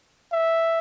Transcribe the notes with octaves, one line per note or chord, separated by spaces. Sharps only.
E5